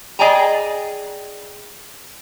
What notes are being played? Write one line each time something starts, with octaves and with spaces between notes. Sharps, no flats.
G#4 D5 D#5 G5 G#5 A#5